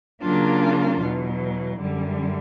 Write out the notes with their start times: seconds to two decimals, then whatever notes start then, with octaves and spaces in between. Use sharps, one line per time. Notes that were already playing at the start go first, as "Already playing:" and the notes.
0.21 C#3 F#3 A#3 D4 F4
1.01 E2 B2 F#3
1.80 F#2 D3 G3